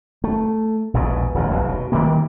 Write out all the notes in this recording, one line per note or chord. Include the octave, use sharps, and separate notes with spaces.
A3
A#1 E2 G#2 B2
D#1 A1 A2
F1 B1 E2
B2
D#3 E3 G3 A#3